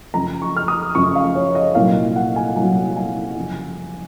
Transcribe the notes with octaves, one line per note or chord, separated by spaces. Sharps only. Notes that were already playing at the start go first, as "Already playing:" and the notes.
F#2 C#3 F3 A#5
C#6
F6
D#6
F#2 C#3 F3 C#6
F5
C#5
D#5
C2 A#2 F#3 F5
F#5
G#5
C2 A#2 F#3 G#5
G#5
F#2 C#3 F3